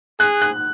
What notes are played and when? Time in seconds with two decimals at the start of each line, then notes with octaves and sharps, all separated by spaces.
0.20 G#4 F#6
0.42 F#6